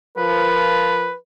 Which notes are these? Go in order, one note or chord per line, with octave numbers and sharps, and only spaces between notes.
F3 A#4 B4